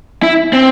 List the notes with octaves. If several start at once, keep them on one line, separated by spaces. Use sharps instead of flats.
E4
C4